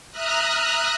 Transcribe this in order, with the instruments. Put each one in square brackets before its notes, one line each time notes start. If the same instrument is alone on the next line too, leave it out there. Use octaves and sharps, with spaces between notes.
[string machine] E5 A#5 D#6 F6 F#6